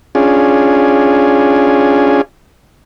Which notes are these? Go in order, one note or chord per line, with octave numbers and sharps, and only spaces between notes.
C#4 D4 F4 G#4